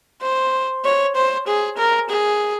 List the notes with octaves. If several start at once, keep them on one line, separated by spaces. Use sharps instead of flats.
C5
C#5
C5
G#4
A#4
G#4